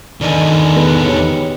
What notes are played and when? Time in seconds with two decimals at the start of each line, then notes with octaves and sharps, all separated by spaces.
0.21 E2 D3 D#3 D5 D#5 G#5
0.76 B3 G#4 B4
1.05 D#4 G4 C#5